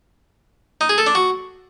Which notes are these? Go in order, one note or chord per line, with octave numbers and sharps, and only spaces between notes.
D#4
G#4
A4
D4
F#4